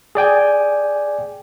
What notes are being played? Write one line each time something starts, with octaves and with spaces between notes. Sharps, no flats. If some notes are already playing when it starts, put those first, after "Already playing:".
G#4 D5 G5 G#5